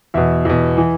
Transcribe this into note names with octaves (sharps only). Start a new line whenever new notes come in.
E2 B2 E5
E2 B2
E3